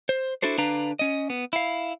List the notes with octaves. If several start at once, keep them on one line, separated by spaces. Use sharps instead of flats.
C5
D4 E4 F#4 A4 C5
D3 D4 B4 F5 A#5
C#4 D#5
B3
E4 F5